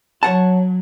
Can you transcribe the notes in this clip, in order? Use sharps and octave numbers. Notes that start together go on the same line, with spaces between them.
F#3 C#5 F#5 A5